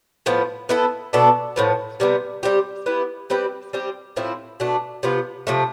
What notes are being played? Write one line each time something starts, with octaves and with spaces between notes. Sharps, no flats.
A2 F3 B3
B3 E4 A4
B2 B3 D4 A4
A2 F3 B3
C3 G3 B3
G3 C4 G4
B3 E4 G4
G3 C4 G4 B4
G3 C4 G4
A2 F3 C4 E4
B2 A3 D4
C3 F3 B3 F4
C3 F3 A3